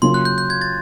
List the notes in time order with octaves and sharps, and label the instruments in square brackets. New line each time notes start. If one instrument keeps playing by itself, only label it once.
[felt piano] C#3 F#3 A#3 C#4 F4 [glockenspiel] C6
[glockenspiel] F#6
G6
G6
G#6
A6